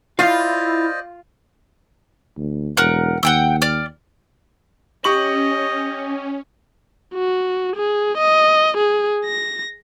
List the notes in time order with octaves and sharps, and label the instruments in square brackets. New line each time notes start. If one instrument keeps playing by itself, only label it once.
[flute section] E4 [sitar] F4 [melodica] C5 D5 D#5 [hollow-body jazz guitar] F5
[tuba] D2
[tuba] E1 [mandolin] A#4 F#5
[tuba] D#2 [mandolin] F#5 G5 E6
[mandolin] D5 F6
[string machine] C#4 [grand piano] G4 C#6 F#7 [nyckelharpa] D#5
[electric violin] F#4
G#4
D#5
G#4
A#6